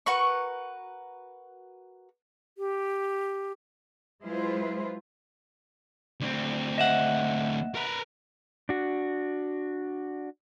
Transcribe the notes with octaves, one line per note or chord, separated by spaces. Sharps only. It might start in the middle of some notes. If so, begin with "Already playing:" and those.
F#4 A#4 B4 C#6
G4
F#3 G#3 E4 F4 B4 C5
D2 C4
D#5 E5 F#5
A#4 B4
D4 F#4